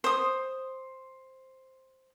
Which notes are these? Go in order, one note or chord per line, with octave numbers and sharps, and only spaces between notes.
C5 D#6